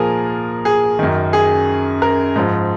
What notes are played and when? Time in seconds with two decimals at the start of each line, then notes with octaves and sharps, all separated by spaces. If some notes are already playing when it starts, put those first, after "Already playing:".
Already playing: A#2 F3 G#4 A#4
0.65 G#4
0.99 F#2 D#3
1.33 G#4
2.02 A#4
2.36 G#2 F3